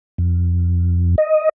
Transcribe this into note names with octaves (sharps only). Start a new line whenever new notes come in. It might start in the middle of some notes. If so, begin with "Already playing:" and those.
F2
D#5